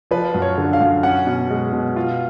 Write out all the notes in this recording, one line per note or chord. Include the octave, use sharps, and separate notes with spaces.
F3 B4
F#2
C#5
D3
F5
F#2
C#4 F#5
B2
G#3
B2
F4